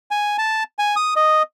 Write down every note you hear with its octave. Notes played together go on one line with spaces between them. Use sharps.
G#5
A5
G#5
D#6
D#5